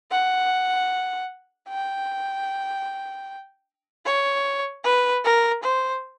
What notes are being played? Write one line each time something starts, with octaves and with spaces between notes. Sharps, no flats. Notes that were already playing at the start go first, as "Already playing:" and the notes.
F#5
G5
C#5
B4
A#4
C5